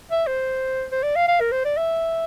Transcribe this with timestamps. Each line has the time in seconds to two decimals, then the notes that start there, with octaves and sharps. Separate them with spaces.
0.11 E5
0.27 C5
0.92 C5
1.03 D5
1.16 F5
1.28 F5
1.40 A#4
1.52 C5
1.65 D5
1.77 E5